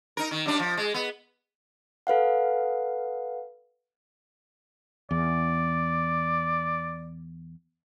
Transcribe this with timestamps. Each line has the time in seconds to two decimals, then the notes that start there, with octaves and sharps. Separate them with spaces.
0.17 D#4 A#4
0.31 D#3
0.46 F#2 G3 D4
0.59 F3
0.77 G#3
0.94 B3
2.07 A4 B4 F5 F#5
5.11 E2 D5